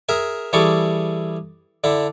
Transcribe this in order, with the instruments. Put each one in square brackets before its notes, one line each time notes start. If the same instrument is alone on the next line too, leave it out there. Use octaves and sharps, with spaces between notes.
[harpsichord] G#4 A#4 E5
E3 G3 G#4 A4 C#6 D6
D3 D4 E4